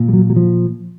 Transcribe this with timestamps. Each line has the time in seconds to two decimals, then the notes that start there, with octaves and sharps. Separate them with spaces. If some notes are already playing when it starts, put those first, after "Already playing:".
Already playing: A#2
0.08 G3
0.13 F#3
0.30 F#3
0.36 F3